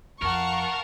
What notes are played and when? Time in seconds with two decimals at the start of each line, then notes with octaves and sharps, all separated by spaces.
0.22 F2 A#4 F5 F#5 A5 C#6